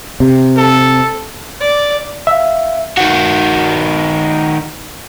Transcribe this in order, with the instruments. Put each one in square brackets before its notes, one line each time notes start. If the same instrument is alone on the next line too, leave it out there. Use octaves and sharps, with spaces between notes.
[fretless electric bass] C3
[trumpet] A4
[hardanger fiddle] D5
[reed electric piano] E5 F5
[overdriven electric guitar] D#3 F#4